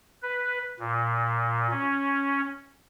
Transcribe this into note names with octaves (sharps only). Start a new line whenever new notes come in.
B4
A#2
C#4